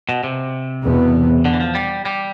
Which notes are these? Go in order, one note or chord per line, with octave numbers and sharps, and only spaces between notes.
B2
C3
E2 B2 B3
D3
E3
F3
G3
G3